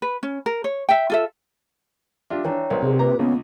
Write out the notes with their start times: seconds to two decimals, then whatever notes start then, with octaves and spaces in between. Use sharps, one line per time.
0.02 B4
0.23 C#4
0.46 A#4
0.64 C#5
0.89 E5 G5
1.10 F4 A4 E5
2.30 D4 F4 G4 E5
2.45 E3 D4 C#5 G5 A#5
2.70 B1 B2 A#4 C5 D5
2.83 C3 G#4
2.99 A#3 F4 B4 A#5 D6
3.19 C#2 C#3 B3